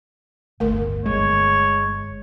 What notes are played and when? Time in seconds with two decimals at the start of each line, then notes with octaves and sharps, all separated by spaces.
0.60 D1 G1 A3 A#4
1.06 G1 G#3 C#5